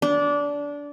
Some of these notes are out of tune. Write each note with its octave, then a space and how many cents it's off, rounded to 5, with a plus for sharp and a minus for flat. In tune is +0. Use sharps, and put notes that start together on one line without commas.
D4 -20